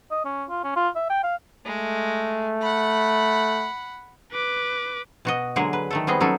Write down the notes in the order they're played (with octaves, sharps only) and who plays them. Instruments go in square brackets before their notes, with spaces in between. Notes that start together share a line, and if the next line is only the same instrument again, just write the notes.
[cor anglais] D#5
C#4
F4
C#4
F4
E5
G5
F5
[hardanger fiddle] G#3 [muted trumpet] A3
[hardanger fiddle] F#5 B5
[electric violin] B4 D6
[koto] B2 F#4 D#5
D3 F#3 G#3 A#3 G#4
B4
D#3 A3 A4
G3 B3 C4 G#4 D#5
F#3 C#4 D#4 G#4 A4